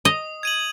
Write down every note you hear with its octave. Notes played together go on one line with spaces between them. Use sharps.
D#5 D#6
G#6 D#7 F#7